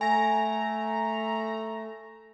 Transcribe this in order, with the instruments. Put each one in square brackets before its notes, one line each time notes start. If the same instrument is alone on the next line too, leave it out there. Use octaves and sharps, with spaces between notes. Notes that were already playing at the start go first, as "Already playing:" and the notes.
[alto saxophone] A3 [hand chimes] G#5 A#6 [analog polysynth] A#5